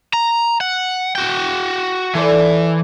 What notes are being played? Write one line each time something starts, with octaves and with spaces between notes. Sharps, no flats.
A#5
F#5
F#4 G5
E3 A4 C5 D5